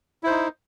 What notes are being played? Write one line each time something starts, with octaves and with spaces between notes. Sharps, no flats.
D#4 E4 C5